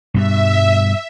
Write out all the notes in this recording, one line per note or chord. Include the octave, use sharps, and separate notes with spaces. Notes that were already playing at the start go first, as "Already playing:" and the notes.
G2 B2 G3 E5